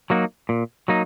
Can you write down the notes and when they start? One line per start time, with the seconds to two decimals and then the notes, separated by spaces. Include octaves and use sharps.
0.10 F#3 A#3 D#4 F#4
0.49 A#2
0.88 F#3 A#3 D#4